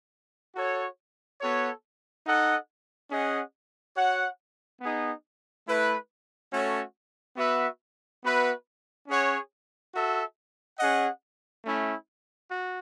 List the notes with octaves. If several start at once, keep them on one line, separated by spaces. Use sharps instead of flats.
F#4 A4 C#5
B3 F#4 A4 C#5
D#4 A4 D#5 F#5
C#4 G#4 D#5 F#5
F#4 C#5 F#5
B3 D#4 G#4
A3 E4 B4
A3 C#4 F#4 A4 C#5
B3 F#4 B4 E5
B3 F#4 B4 E5
C#4 G#4 C#5 F#5
F#4 A4 E5
C#4 G#4 D#5 F#5
A3 C#4 E4
F#4